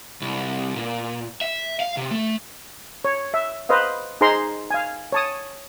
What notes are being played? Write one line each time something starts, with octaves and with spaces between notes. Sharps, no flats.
C2
A#2
E5
F5
C3
A3
C#5
E5
B4 C5 D#5 F5
D#4 G#4 C5 A#5 C6
F5 G#5
C#5 A5 D#6